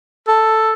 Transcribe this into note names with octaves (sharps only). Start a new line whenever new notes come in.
A4